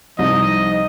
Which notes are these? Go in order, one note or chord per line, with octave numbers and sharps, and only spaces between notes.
C2 F3 D#4 D#5